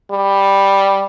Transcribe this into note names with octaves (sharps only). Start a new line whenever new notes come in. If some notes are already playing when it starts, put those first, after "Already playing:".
G3